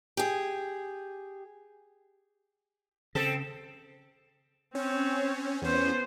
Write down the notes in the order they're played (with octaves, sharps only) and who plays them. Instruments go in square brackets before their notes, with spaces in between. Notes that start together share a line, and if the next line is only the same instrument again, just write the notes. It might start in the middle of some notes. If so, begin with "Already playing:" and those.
[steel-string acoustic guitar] G4 G#4
[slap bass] C#3 [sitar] C4 A4
[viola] C4 C#5 [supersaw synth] C#4
[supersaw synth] E2 C#4 [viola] B3 C5